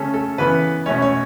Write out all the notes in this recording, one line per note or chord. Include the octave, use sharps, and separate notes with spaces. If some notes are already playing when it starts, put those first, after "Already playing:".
Already playing: C#3 A3 C#4 A4
A4
C#3 E3 B3 B4
B2 A3 C#4 C#5
C#5